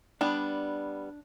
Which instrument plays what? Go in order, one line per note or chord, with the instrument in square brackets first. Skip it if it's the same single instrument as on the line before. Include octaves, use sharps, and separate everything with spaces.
[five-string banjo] G3 B3 [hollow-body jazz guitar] D4